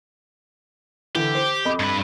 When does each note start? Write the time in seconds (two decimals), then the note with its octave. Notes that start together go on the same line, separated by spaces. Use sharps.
1.15 D3 E3 G4
1.35 C5
1.65 F2 D#5 B5
1.80 G2 B4